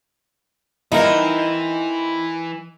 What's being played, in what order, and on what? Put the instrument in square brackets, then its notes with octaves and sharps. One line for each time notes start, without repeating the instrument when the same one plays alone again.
[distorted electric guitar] E3 [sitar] C4 E4 [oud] D#4 [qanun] A#4 F#5 A#5